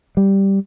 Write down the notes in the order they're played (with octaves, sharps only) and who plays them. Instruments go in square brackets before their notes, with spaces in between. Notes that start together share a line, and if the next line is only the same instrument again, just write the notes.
[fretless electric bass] G3